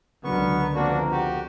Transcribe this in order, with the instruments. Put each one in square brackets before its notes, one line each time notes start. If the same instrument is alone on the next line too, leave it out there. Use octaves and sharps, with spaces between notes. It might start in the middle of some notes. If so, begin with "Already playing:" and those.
[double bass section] C#2 D3 [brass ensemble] F#3 D4 A#4 [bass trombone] B3 [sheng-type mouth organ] C#6
[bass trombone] F2 [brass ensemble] F3 B3 A#4 [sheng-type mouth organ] A#3 D4 F#4
[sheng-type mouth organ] F#4 G4